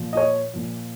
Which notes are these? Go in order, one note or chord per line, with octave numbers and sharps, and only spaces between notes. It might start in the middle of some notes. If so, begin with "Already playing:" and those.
Already playing: A#2 F3
D#5
C#5
A#2 F3